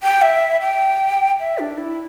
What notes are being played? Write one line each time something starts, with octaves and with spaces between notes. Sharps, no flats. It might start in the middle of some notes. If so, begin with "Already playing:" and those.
G5
E5
G5
E5
D4
E4